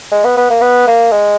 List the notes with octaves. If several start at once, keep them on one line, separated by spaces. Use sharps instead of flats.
G#3
B3
B3
A#3
B3
A#3
G#3